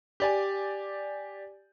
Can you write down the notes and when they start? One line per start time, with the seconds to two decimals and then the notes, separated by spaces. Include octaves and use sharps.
0.20 G4 D5 G#5